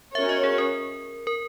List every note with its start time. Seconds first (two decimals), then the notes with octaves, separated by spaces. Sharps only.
0.15 C#4 F#4 A#4 C#5 E5
0.29 D#5
0.44 G#4
0.58 A#4
1.27 A#4